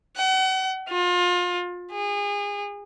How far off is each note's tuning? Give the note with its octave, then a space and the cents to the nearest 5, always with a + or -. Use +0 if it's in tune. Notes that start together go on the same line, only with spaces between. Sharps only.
F#5 +35
F4 +30
G#4 -30